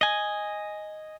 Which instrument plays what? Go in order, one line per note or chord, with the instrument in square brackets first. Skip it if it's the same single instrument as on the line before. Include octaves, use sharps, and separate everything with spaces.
[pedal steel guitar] D#5 G#5